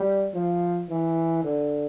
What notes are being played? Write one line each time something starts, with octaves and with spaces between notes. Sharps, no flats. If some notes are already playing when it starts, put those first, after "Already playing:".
Already playing: G3
F3
E3
D3